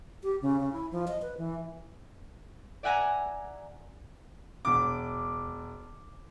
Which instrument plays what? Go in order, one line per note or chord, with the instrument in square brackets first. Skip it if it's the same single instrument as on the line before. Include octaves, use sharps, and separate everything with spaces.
[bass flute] G4
C#3
C#3
E4
F3
D#5
B4
E3
[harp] D5 E5 F#5 G#5 A#5
[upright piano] E1 D6